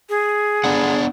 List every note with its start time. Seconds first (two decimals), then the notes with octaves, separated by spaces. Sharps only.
0.09 G#4
0.64 B3 D4 F#5